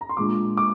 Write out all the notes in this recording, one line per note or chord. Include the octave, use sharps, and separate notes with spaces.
A#5
C6
A#2 G#3 D4 F4 D6
D6